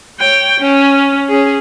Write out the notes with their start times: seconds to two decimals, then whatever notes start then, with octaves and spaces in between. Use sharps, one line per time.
0.19 C#5 G5
0.60 C#4
1.29 C#4 G#4